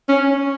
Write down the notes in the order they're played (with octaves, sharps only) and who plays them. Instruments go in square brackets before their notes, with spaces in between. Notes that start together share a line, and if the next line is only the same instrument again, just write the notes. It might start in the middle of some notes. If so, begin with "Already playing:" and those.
[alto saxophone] C#4